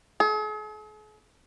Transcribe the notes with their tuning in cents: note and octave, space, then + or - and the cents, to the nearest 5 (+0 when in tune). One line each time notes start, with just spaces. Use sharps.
G#4 +45